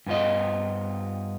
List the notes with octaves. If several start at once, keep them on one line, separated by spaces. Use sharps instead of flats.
G2 B3 F4 D#5